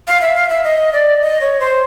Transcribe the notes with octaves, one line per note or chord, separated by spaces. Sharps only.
F5
E5
F5
E5
D#5
D5
D#5
C#5
C5